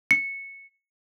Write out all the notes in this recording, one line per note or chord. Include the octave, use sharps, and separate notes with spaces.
C#7